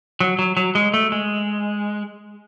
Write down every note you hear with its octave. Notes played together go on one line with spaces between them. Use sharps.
F#3
F#3
F#3
G#3
A3
G#3